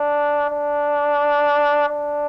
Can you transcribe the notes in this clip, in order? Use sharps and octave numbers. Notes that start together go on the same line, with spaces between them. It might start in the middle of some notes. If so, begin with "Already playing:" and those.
Already playing: D4
D4
D4